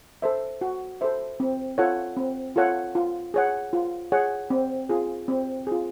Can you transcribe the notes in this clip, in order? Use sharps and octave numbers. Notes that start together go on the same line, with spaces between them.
A4 C5 E5
F#4
A4 C5 E5
C4
F4 A4 C#5 F#5
C4
F4 A4 C#5 F#5
F4
G#4 C#5 F#5
F4
G#4 C#5 F#5
C4
F4 G#4
C4
F4 G#4